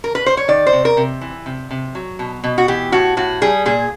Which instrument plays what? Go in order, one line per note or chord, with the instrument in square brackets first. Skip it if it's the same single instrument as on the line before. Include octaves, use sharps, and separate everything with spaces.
[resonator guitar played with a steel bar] A#4
B4
C5
C#5
D#3 D5
C5
C3
A#4
C3
E3
C3
C3
F#3
B2
B2
F#4
E3 G4
A2 F#4
A2 F#4
G3 G#4
A#2 G#4